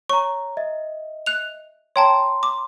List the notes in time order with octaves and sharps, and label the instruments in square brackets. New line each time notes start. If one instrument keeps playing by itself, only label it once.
[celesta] C#5 A#5 [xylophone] C#6
[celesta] D#5 E5
[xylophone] F#6 F7
[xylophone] C#5 G5 A5 [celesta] A#5 C6
[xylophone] D6